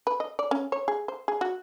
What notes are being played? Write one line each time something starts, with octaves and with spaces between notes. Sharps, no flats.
B4
D#5
D5
C#4
C#5
G#4
C5
G#4
F#4